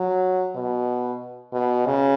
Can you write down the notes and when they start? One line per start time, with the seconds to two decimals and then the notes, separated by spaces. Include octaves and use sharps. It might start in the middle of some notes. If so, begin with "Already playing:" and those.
Already playing: F#3
0.55 B2
1.53 B2
1.86 C#3